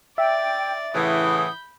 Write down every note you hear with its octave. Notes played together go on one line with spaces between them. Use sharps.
D5 E5 G5 A6
A2 C#3 E3 F#5 B5 D#6 G6